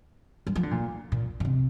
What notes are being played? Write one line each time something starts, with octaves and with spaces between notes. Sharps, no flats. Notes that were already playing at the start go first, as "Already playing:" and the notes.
G3
F3
D3
A#2
A#2
A#2
C3